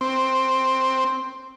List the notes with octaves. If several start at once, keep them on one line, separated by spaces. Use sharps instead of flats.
C4